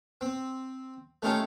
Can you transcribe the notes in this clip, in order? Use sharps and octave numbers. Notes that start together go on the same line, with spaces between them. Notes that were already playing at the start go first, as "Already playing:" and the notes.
C4
A3 C#4 D#4 F4 G4 A4